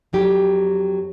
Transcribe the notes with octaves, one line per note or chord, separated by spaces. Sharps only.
F2 F#3 G4